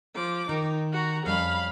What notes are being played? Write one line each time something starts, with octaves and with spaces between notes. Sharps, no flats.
F3 D6
D#3 D#4
F#4 A#5
F2 G3 C#4 F5 B5